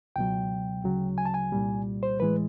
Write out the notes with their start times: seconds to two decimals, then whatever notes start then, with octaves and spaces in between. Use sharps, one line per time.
0.16 C#2 B2 F#3 G5
0.84 D2 C#3 F#3
1.18 G#5
1.26 A5
1.34 G#5
1.52 C2 A#2 G3
2.03 C5
2.20 A2 E3 G#3 B4